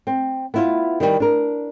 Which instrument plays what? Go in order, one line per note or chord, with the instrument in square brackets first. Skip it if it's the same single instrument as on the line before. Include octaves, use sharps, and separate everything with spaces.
[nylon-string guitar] C4
B3 E4 F4
D#3 G3
D4 A#4